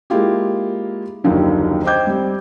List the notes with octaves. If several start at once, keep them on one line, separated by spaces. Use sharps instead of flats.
G#3 A#3 E4 F4 G4
F#1 D#2 D3 D#3 F3 F#3
C5 D#5 G5 D6 G6 G#6
G3 C4